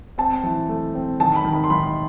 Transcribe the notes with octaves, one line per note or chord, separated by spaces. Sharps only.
C4 A5
E3
A3
C4
D#3 A5
B5
D#3
B5
C6
D#3 B5